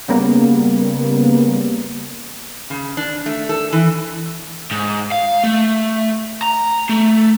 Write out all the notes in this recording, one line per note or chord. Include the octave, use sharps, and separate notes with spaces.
C#3 G3 A#3 B3
C#3
D4
A3
A4
E3
G#2
F5
A3
A#5
A3